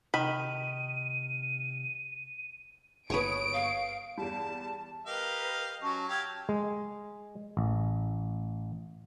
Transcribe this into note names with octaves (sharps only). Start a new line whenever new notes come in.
C3 D#3 B5 D#7
G1 B4 C#5 C#6 D#6 D7
F5
E2 G3 A5
G4 A#4 B4 D#5 F5
F#3 C#4 A5 C#6
G4 F5 A5 E6 G#6
G#3
A1